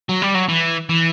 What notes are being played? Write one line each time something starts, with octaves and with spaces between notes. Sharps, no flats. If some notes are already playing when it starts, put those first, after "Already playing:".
F#3
G3
F#3
E3
E3